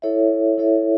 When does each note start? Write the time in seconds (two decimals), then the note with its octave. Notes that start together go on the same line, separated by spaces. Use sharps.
0.02 E4 A4 C#5 E5
0.58 E4 A4 C#5 E5